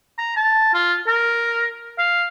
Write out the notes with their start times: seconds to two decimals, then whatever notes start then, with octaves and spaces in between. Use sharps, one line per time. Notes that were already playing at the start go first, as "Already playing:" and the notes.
0.18 A#5
0.36 A5
0.74 F4
1.07 A#4
1.98 F5